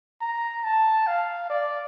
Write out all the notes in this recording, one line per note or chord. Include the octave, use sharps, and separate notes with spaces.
A#5
A5
F5
D5